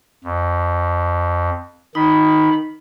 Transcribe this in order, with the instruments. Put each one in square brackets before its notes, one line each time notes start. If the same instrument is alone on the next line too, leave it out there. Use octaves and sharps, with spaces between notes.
[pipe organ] F2
[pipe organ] D#3 B5 [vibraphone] D#4